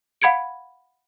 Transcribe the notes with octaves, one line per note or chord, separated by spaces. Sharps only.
F5 F#5 B5 G#6 C#7 D7